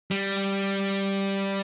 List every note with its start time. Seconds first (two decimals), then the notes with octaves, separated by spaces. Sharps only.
0.11 G3